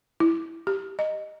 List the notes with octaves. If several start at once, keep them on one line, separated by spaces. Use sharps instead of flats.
E4
G4
D#5